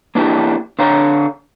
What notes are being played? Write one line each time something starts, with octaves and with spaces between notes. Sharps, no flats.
A#3 D4 E4 F#4 G4
D3 C#5 F5 A#5